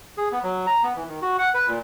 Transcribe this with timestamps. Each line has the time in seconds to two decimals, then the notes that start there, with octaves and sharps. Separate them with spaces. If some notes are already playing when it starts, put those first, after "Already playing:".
0.17 G#4
0.32 B3
0.43 F#3
0.67 A#5
0.83 B3
0.96 E3
1.08 D#3
1.22 F#4
1.39 F#5
1.54 B4
1.68 A#2